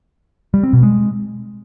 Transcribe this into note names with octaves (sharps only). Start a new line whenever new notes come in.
G3
C4
B2
G#3